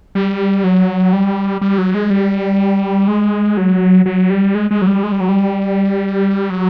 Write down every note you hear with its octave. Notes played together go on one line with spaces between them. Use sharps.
G3
F#3
G3
G3
F#3
G#3
G3
G#3
F#3
F#3
G3
G#3
G#3
F#3
G3
G#3
G3
F#3
G3
F#3